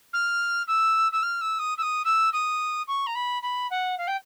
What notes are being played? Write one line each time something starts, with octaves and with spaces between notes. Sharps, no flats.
F6
E6
E6
F6
E6
D#6
E6
D#6
E6
D#6
C#6
A#5
B5
B5
F#5
F5
G5